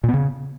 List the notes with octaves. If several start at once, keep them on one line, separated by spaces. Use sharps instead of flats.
A#2
B3
C#3